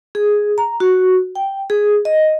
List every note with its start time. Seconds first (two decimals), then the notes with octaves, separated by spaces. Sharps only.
0.15 G#4
0.58 A#5
0.80 F#4
1.35 G5
1.70 G#4
2.05 D#5